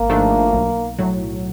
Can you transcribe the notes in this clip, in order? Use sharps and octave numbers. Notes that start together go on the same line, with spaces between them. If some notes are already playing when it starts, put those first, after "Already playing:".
Already playing: G#1 A#3
G#2 F3 A3 D4
B1
A2 F#3